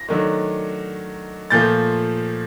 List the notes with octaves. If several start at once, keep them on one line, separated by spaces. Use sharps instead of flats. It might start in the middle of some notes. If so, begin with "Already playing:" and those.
Already playing: A#6
D#3 F#3 A3 D4
A#2 F3 A3 G6 A6